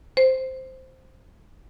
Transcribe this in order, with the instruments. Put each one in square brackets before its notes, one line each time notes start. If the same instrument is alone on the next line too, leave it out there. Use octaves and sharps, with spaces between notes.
[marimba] C5